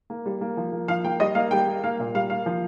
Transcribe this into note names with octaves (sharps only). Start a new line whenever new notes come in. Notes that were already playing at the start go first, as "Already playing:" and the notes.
A#3
G3
A#3
F3
A#3
F3 F5
A#3 G5
G3 D#5
A#3 F5
G3 G5
A#3
A#3 F5
A#2
G3 F5
A#3 F5
F3